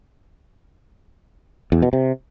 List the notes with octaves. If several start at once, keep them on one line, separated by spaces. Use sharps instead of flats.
E2
B2
C3